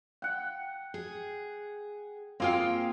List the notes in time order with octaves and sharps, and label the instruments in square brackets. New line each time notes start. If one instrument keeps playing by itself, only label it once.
[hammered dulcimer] F#5 G5
[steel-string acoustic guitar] G#4
[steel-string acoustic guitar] A#3 F4 G5 [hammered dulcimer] C4 G#4 F5